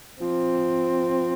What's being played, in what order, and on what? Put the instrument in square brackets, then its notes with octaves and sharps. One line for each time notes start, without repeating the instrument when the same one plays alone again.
[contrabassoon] F3 [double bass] C4